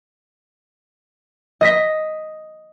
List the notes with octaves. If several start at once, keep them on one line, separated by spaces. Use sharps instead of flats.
D#5 A#6 B6